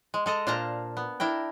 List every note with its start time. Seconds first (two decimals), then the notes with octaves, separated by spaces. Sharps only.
0.14 G#3
0.26 G#3 A4 D#5 A#5
0.47 A#2 D4 C5 F5 A5 A#5
0.97 B3
1.20 D4 E4 A#4 G5